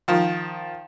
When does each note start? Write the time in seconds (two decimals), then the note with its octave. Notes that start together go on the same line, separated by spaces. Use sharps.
0.08 D#3 F3